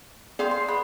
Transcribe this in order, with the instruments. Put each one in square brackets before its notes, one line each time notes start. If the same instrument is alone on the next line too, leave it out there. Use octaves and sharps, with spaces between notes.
[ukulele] G#4 F5 [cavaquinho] C5 G5 C6 [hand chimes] D5
[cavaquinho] C6
[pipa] B3